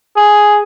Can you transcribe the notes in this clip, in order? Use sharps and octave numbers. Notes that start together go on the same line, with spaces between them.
G#4